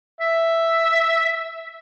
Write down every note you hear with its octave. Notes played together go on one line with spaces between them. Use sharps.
E5